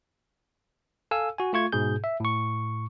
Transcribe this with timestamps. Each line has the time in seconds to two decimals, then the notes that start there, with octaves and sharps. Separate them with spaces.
1.11 A4 F5 G#5 E6
1.38 F#4 G#5
1.53 A3 F4 C#6 G#6
1.72 G#2 B2 G#4 G6
2.04 E5
2.20 A2 C#6